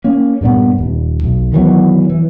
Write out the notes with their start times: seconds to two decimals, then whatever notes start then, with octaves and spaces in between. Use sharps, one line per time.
0.04 A#3 C#4
0.41 G2 A#2 G3 B3
0.78 D#1
1.24 B1
1.53 D#3 E3 F#3 B3
2.10 E3